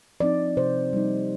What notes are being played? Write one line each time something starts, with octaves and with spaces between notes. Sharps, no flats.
F3 C4 D#4 D5
C3 C5
G3 A#3 D#4